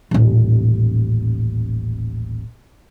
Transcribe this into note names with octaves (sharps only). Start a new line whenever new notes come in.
D#1 A1